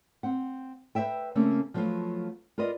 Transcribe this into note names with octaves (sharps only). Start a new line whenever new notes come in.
C4 F#5
B4 C5 D5 E5 G5
C#3 A3 A#3 C4 C#4
F3 F#3 A3 B3 F4
F4 A#4 B4 D5 D#5